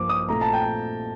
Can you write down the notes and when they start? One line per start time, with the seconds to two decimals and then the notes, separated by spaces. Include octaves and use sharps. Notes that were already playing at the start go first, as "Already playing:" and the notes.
Already playing: G2 F3 A#3 D6
0.09 D#6
0.28 A#2 A3 C4 F4 A#5
0.41 A5
0.53 G5